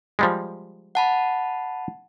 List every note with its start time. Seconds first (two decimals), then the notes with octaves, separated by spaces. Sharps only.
0.19 F3 G3 G#3
0.95 F#5 A5 B5